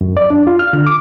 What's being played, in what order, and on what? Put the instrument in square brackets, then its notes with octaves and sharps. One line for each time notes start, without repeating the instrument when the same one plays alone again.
[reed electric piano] F#2
D5
D4
F4
F6
D3
D6